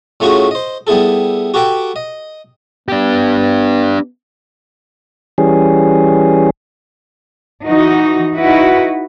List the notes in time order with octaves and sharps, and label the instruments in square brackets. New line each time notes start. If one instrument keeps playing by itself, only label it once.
[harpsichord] A2 A3 C#4 F4 F#4 G#4
C5 D#5
G3 B3 E4 G#4 A4
F#4 G4 A4 B4 F#5 G5
D#5
[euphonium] B3 [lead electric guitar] D4 G4
[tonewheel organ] E3 G3 C#4 G#4
[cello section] E3 D#4 F#4
D#4 E4 F#4 B4